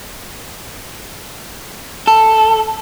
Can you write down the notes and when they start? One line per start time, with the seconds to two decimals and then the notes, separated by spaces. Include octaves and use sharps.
2.07 A4